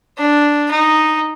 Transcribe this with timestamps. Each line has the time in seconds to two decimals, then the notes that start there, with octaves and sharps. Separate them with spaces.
0.18 D4
0.71 D#4